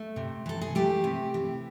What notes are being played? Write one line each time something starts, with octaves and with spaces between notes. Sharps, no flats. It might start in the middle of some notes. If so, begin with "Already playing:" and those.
Already playing: A3
C3
E3 A4
G#4
A3 G4
C3
E3